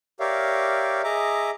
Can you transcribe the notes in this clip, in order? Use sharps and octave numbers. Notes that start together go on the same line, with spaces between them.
G4 A#4 C#5 D5 E5 F5
G#4 D#5 E5 A#5 D6